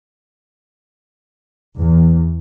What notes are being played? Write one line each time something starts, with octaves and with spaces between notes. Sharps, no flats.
E2